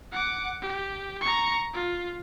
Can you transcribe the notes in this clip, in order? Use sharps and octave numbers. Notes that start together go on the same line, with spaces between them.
F#5 D6
G4
A#5 C#6
F4